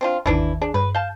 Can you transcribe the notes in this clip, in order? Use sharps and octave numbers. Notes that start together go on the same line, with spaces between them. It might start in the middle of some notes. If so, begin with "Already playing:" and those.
C4 D4 F4
G1 D#2 D#3 E3 D4 E4
D4 G#4
G2 B4
F5 A5 G6